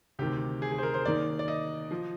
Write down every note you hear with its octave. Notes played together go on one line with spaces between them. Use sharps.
D2 C3 D#3 G4
G#4
G#4
C5
A#4
C5
D#2 D#3 D5
D5
D#5
F3